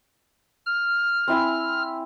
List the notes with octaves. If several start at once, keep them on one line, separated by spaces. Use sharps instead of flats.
F6
C4 E4 G#5